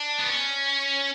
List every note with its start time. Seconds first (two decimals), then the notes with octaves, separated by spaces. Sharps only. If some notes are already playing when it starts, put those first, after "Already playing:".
Already playing: D4
0.19 B3
0.28 C#4